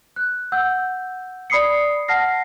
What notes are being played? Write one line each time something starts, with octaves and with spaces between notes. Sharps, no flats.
F#6
F#5 E6 G6
D5 B5 D#6 C7 C#7
F#5 A5 F6 A#6 C7